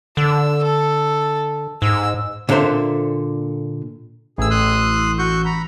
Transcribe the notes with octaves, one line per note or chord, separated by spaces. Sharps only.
D3 E6
A4
G#2 E6
A#2 D3 A4 A#4 C5 E5
A1 G#4 E6
C6 D#6 F#6
F#4 C#6 G6
A#5 B5